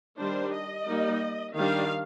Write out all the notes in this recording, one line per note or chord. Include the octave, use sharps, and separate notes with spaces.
D#3 G3 D4 C5
D#5
G3 A#3 D#4
D#3 G3 D4 F5